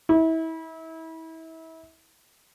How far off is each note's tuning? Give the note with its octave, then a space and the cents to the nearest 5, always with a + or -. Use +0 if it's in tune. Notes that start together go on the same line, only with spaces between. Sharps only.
E4 -30